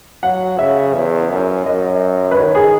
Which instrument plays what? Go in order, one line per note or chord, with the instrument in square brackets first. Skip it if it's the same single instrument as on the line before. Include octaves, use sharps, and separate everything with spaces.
[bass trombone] F#3 [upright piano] F#5
[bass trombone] C#3 [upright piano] E5
[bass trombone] E2
F#2
[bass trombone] F#2 [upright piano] D#5
[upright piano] B4
[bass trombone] D#3 [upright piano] C#5
[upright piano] G#4